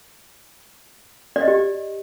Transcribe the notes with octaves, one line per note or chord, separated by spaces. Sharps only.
D5
D#5
G4